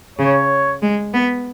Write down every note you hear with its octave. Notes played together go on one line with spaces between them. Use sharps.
C#3 C#5
G#3
B3